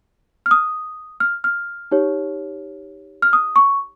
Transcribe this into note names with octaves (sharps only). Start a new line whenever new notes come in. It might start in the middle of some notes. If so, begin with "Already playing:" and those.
F6
D#6
F6
F6
D#4 G4 C#5
F6
D#6
C#6